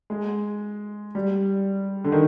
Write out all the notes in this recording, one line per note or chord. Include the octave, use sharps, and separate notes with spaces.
G#3
G3
D3
D#3